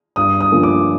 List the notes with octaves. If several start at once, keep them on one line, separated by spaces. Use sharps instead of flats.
G2 D#6
D#6
D3 F3 A#3 C#4
D6